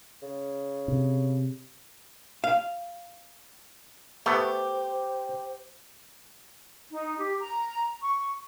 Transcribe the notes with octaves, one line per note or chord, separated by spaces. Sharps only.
C#3
C3
F5
A3 B3 G4 C5
D#4
G4
A#5
C#6